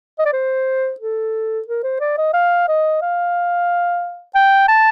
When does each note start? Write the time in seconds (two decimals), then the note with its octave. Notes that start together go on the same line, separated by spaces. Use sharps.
0.19 D#5
0.25 D5
0.33 C5
1.00 A4
1.68 A#4
1.83 C5
2.00 D5
2.17 D#5
2.33 F5
2.68 D#5
3.02 F5
4.35 G5
4.68 A5